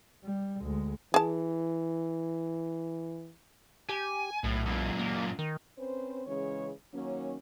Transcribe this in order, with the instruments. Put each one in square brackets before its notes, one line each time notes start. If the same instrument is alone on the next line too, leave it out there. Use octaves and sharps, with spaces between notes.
[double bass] G3
D2 G#3
[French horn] E3 [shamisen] G#4 A5
[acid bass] G4 [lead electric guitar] G#5
[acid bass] B1 [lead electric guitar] A2
[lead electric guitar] F#2 A#2
[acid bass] A#3
D#3
[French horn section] C4 C#4 B4 C5
C#3 E3 G#3 C#4 G#4 C#5
D#3 F#3 A#3 C#4